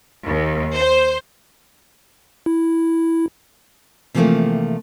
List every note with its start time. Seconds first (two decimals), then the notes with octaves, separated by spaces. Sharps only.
0.24 D#2
0.75 C5
2.46 E4
4.14 C3 E3 F3 A3 A#3 C4